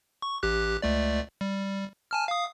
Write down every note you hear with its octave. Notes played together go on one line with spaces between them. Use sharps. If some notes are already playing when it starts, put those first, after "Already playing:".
C#6
A1 G4 F#6
C#2 A3 D5
G3
G#5 A5 F6
F5 D#6